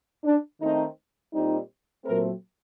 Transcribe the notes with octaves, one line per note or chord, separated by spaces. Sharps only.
D4
D#3 A3 C4 D#4
A#2 G3 C4 D#4
A#2 F#3 A3 C4 A#4